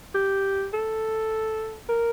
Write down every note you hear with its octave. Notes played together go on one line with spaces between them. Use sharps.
G4
A4
A#4